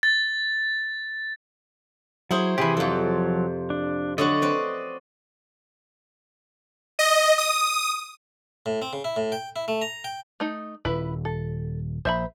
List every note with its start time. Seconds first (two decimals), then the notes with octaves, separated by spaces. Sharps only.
0.03 A6
2.31 F#3 E4 G#4 C5
2.58 C3 E3 G4 G#4 B5
2.77 F2 F3 F#3 A4
3.70 D4
4.18 D3 F#3 F#4 D5 D#5
4.42 C4 B4
6.99 D#5
7.38 D#6
8.66 A2
8.82 C4
8.93 C#3
9.04 E4
9.16 A2
9.32 G5
9.56 E4
9.68 A3
9.82 A#5
10.04 G5
10.40 A3 D#4
10.85 D#1 E4 B4
11.25 A4
12.05 A#1 C5 E5 B5